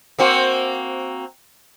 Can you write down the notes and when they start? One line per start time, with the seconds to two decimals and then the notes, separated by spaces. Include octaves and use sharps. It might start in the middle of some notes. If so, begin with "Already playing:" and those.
0.19 A#3 C4 F#4